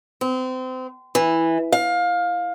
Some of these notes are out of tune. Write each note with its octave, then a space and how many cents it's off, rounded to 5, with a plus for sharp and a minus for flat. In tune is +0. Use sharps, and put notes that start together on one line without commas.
C4 -30
E3 -5
F5 +20